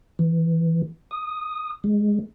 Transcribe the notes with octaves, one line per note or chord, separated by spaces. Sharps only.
E3
D#6
G#3